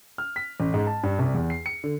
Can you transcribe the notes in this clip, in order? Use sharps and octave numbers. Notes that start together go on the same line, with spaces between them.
F6
B6
A1
G#2
A5
G2
C2
E2
C7
C#7
D3